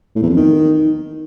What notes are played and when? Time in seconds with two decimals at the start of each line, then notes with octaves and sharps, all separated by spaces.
0.16 A2
0.23 E2
0.30 F2
0.37 D#3